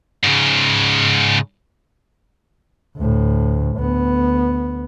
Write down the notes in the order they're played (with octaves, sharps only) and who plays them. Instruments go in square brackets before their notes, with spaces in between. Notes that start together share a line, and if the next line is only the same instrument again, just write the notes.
[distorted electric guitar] G#2 C#3
[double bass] D2 A2
D2 B3